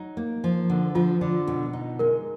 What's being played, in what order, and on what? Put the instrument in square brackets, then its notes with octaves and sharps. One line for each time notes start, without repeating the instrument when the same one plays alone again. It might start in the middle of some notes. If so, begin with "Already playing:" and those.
Already playing: [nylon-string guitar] F#3 D#4
A#3
F3
D3
[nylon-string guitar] F3 [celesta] F4
[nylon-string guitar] D3
B2
D#4
[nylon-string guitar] G#3 [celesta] A#4